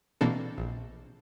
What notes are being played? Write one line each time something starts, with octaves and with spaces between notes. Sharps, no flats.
B2 E3 A#3 C4 D4 A4
A#1